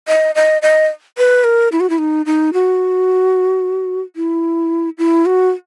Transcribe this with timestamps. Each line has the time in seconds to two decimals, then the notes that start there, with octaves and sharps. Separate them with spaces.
0.08 D#5
0.35 D#5
0.62 D#5
1.18 B4
1.44 A#4
1.72 E4
1.80 F#4
1.90 E4
1.98 D#4
2.26 D#4
2.53 F#4
4.16 E4
4.98 E4
5.26 F#4